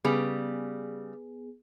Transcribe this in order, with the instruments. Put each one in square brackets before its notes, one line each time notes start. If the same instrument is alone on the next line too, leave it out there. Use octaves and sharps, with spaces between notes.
[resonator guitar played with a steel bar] C#3 G3 [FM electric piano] B3 G#4